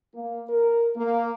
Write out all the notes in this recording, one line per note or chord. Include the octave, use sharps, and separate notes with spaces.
A#3
A#4
A#3